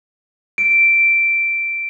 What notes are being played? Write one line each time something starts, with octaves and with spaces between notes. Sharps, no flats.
D7